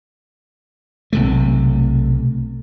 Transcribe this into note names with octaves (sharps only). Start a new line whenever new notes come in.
B1 C3 A3